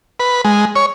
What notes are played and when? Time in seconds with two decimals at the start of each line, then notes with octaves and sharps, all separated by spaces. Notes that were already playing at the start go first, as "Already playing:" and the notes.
0.20 B4
0.45 G#3
0.76 C#5